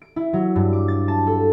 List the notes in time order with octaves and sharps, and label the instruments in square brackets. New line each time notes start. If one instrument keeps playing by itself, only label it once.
[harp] D7
E4
F#3
G2
D6
A6
A5
A4